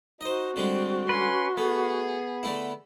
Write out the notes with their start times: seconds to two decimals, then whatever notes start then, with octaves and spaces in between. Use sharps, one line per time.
0.21 D#4 F#4 C5 D#5
0.56 D3 G3 G#3 C4
1.09 C#4 B4 C6
1.57 A3 B3 G#4
2.43 D3 A3 E4